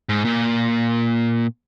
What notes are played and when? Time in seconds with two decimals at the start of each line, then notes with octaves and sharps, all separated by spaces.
0.09 G#2
0.25 A#2